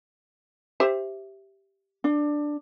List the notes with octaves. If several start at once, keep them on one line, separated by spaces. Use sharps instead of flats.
G4 C5 E5
D4